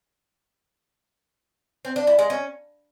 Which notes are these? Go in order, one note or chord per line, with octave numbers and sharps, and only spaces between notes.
C4
D4
E4
G#3
C#4